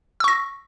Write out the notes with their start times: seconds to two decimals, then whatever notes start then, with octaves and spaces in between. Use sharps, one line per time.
0.20 E6
0.24 C#6
0.28 A#6